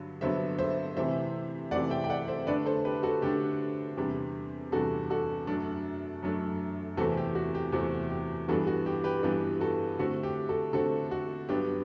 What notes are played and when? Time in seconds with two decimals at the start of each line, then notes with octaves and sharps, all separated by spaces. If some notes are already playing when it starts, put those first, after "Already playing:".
Already playing: G2 D3 F#3
0.21 G2 D3 F#3 B3 D4 C5 E5
0.59 C5 E5
0.97 C3 E3 A3 C5 E5
1.71 C3 E3 A3 D5 F#5
1.90 E5 G5
2.04 G5
2.10 D5 F#5
2.28 C5 E5
2.47 D3 A3 D4 B4 D5
2.66 A4 C5
2.85 G4 B4
3.03 F#4 A4
3.22 D3 A3 D4 G4
3.97 E2 C3 G3 D4
4.72 E2 C3 G3 D4 F#4 A4
5.10 F#4 A4
5.47 F#2 F#3 A3 D4
6.23 F#2 F#3 A3 D4
6.97 E2 C3 E3 A3 C4 F#4 A4
7.17 G4
7.35 F#4
7.55 G4
7.72 E2 C3 E3 A3 C4 F#4
8.10 G4
8.48 G2 E3 G3 B3 D4 F#4 A4
8.67 F#4
8.86 G4
9.04 G4 B4
9.23 G2 E3 G3 B3 D4 G4 B4
9.60 F#4 A4
9.98 D3 A3 C4 F#4
10.23 G4
10.49 F#4 A4
10.73 D3 A3 C4 F#4 A4
11.11 F#4
11.49 G2 F#3 B3 D4 G4